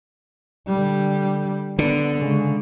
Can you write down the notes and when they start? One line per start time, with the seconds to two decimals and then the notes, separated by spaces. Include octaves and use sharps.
0.67 D3 G3
1.79 D3 B3
2.20 C#3 G#3